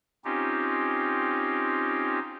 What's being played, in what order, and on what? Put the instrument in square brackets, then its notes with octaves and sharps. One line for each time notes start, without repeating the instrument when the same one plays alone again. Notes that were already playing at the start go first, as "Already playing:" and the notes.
[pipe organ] C4 C#4 D#4 F4 G4